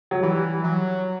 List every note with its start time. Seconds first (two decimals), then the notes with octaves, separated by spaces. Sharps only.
0.11 F#3
0.23 E3 G3
0.64 F#3